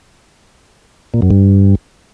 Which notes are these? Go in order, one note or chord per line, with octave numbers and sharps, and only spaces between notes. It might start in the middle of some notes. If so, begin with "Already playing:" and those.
A#2
F#2
G2